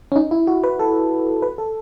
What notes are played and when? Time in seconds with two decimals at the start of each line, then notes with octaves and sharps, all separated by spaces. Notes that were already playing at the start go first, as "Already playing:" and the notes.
0.12 C#4
0.16 D#4
0.31 E4
0.47 F#4
0.64 B4
0.80 A4
1.42 B4
1.58 A4